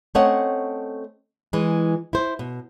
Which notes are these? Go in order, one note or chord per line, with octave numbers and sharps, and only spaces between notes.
A3 C4 C#4 C#5 D#5 F#5
E3 G#3
E4 C5
B2